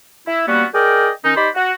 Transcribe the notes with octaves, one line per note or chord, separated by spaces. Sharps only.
E4
G3 A#3 B3 C#4 F#4
G#4 A#4 D5 D#5 G5
D#3 C#4 D#4
D#4 G4 C5 D5 B5
F#4